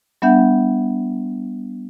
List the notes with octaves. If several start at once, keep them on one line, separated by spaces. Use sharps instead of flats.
G3 B3 D4 E5 F#5 G6